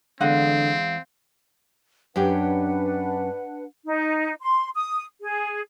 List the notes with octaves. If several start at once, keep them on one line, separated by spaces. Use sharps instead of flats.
E2 D3 G#3 C4 F5 F#5
F#2 C#4 D4 G4 B4 F#5
D#4
C6
D#6
G#4